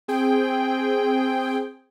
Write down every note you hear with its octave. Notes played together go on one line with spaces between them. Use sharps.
C4 G#4 G5